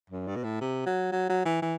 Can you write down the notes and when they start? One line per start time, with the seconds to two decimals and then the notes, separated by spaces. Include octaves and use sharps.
0.10 F#2
0.27 G2
0.36 B2
0.44 A2
0.61 C3
0.86 F#3
1.12 F#3
1.29 F#3
1.45 E3
1.62 E3